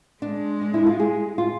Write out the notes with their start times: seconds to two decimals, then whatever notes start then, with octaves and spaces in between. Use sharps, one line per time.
0.22 G#3 D4
0.61 D4
0.74 E4
0.87 F4
1.00 G#4
1.38 F4